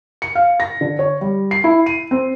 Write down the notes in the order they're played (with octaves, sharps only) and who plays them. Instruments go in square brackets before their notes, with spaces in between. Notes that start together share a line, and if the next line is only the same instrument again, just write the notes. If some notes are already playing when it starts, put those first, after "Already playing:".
[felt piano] C#7
F5
A#6
D3
C#5
G3
C7
E4
D#7
C4